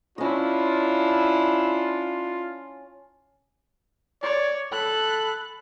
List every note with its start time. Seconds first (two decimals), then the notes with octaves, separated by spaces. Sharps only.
0.18 C#4 D4 E4 F4 D#5
4.22 C#5 D5
4.72 A4 B5 F#6